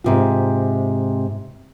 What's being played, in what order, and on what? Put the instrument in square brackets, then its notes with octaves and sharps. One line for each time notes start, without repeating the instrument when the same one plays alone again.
[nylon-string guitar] G#2 C3 F4